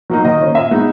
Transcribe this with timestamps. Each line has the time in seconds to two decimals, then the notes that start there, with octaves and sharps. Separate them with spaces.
0.10 F#3 A#3 D#4
0.25 D#3 D#5
0.40 A#3 C#4
0.55 A#2 E5
0.71 G#3 B3 D#4